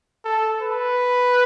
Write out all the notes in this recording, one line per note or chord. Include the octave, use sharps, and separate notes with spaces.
A4
B4